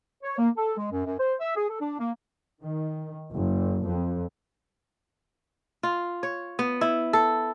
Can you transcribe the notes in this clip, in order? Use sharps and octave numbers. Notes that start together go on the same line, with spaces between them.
C#5
A#3
A4
G#3
F#2
F#2
C5
E5
G#4
A4
D4
A#3
D#3
F#1
F2
F4
C#5
B3
E4
A4